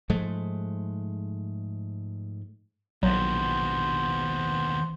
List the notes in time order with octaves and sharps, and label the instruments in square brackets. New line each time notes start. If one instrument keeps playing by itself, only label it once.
[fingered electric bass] G#2 F3 G#3 A3
[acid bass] A#1 [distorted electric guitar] D#2 B2 [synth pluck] F#3 [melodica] B3 C5